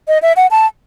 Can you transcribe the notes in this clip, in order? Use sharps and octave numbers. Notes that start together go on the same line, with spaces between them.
D#5
E5
F#5
A5